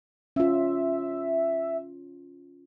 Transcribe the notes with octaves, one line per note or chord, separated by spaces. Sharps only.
C#4 F4 E5